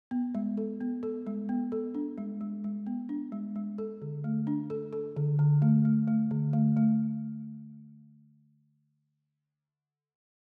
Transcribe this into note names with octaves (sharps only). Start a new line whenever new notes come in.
B3
G#3
A4
B3
A4
G#3
B3
A4
D4
G#3
G#3
G#3
B3
D4
G#3
G#3
A4
D3
A3
D4
A4
A4
D3
D3
A3
A3
A3
D3
A3
A3